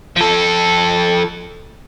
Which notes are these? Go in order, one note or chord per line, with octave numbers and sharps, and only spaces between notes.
F3 A4